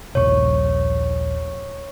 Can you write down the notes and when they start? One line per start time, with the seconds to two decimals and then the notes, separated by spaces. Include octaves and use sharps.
0.15 D#1 A#1 C#5 C#6